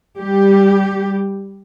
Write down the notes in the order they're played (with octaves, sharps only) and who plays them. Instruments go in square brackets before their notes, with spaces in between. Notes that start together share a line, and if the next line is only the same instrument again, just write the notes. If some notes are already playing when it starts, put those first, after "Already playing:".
[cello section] G3 G4